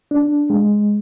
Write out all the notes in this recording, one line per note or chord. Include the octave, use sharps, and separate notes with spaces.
D4
G#3